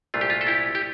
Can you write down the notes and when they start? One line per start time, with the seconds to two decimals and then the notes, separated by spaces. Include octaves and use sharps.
0.14 C2 A#2 A3 D4 F4
0.21 G4
0.30 F4
0.41 A4
0.47 E4 G4
0.75 G4